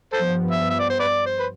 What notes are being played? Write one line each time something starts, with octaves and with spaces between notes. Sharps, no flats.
G2 F3 B3 A4 C5
E5
E5
D5
C5
B4 D5
C5
B4